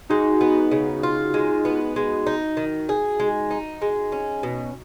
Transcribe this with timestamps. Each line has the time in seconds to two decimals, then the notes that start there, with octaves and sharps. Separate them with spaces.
0.10 G#3 D#4 F#4
0.41 B3
0.71 C#3
1.03 F4
1.34 G#3
1.65 B3
1.96 G#3
2.27 D#4
2.57 D#3
2.89 G#4
3.20 G#3
3.51 D#4
3.82 G#3
4.12 C#4
4.43 B2